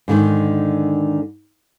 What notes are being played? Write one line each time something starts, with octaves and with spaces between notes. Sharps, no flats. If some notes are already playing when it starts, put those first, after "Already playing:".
G#2 D3 D#3